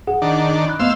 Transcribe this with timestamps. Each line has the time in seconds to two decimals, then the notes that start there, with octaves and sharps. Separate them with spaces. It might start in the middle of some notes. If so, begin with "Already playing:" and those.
0.07 G#4 F#5
0.22 D#3 D4
0.68 B5 F#6
0.79 A3 B3 C5 D#5 F5 E6